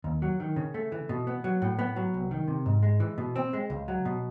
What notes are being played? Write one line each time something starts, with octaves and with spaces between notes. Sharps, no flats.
D#2
F#3
D#3
C#3
A3
E3
B2
B3
F#3
A2
B3
F#3
C2
D#3
C3
G#2
G#3
E3
B2
C4
G#3
C#2
F#3
B2